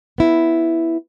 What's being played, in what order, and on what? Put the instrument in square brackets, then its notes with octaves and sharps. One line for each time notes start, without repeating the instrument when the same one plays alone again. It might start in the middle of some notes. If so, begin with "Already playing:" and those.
[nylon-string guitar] B3 E4